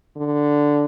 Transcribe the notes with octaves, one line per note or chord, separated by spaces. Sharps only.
D3